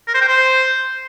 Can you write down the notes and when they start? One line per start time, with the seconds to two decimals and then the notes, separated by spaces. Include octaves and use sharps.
0.08 A#4
0.15 C5
0.21 G5
0.28 C5